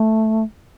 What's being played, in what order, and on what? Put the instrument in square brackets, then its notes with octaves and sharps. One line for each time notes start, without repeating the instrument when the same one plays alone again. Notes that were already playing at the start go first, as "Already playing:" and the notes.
Already playing: [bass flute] A3